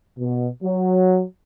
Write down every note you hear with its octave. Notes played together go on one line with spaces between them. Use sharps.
B2
F#3